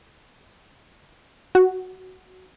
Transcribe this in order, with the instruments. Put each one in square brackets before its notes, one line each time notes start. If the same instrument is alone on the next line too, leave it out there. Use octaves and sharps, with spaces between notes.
[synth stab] F#4